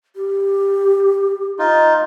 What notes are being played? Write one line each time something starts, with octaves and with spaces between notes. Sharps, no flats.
G4
D#4 F4